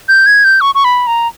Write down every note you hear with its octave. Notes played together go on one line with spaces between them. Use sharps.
G6
G#6
G6
C#6
C#6
B5
A#5